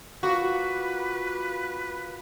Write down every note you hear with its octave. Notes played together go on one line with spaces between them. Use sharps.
A#3 F4 F#4 B4